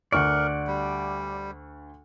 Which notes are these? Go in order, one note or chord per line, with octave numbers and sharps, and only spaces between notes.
D2 A#4 D5 F#5 C#6
G3